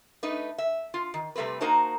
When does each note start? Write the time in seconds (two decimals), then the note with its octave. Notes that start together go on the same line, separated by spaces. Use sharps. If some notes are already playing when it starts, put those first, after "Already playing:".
0.23 A3 D#4 B4
0.58 E5
0.94 F4
1.14 D#3
1.36 C3 G3 A3 C4 B4
1.61 A#3 D#4 F#4 A#4 C5 A5